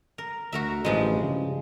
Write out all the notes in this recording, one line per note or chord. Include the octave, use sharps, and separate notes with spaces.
A#4
D2 F#4 A#4 E5
A1 G2 F3 G#3
C#3